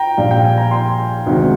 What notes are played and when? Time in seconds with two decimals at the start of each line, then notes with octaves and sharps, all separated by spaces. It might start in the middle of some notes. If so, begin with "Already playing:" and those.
Already playing: G5 A#5
0.17 A#1 A#2 G3 F5
0.31 G5
0.44 G#5
0.58 A#5
0.71 G#5 C6
1.27 D2 C3 D#3 G#3